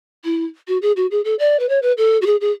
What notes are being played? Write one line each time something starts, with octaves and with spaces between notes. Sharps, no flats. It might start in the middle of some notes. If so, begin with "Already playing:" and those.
E4
F#4
G#4
F#4
G#4
A4
D5
B4
C#5
B4
A4
F#4
G#4
G#4